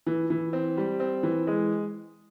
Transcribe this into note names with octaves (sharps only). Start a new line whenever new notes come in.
E3
E3
C4
G3
C4
E3
G#3